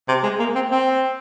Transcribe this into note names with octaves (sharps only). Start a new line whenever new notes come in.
C3
G#3
A#3
C4
C4